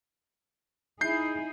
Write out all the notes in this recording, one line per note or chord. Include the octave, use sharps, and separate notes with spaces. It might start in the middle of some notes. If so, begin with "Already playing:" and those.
D#4 E4 G#4 G6 C7